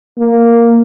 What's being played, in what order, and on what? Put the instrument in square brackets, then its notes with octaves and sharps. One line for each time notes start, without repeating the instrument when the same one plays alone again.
[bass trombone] A#3